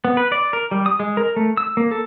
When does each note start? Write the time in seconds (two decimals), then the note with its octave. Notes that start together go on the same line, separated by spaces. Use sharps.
0.05 B3
0.17 B4
0.32 D5
0.53 A#4
0.71 G3
0.86 D#6
1.00 G#3
1.17 A#4
1.36 A3
1.57 E6
1.77 A#3
1.91 A4